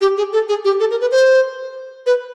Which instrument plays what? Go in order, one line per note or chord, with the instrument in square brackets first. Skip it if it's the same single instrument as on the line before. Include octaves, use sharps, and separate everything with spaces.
[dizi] G4
G#4
A4
G#4
G4
A4
A#4
B4
C5
B4